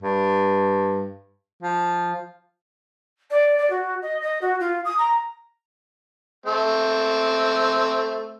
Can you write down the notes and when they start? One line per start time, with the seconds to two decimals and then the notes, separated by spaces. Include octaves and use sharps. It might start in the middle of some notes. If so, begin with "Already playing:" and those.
0.02 G2
1.62 F3
3.30 D5
3.58 D5
3.70 F#4
4.02 D#5
4.21 D#5
4.41 F#4
4.60 F4
4.85 D#6
4.98 A#5
6.46 A3 C4